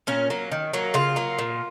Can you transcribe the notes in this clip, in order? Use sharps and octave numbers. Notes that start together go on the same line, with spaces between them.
A#2 C#4
F#3 A#3
D#3
F#3 A#3
C#3 F4
F#3 A#3
A#2